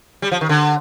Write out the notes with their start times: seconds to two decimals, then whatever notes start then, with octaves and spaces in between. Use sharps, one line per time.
0.22 G3
0.32 F3
0.41 D#3
0.49 D3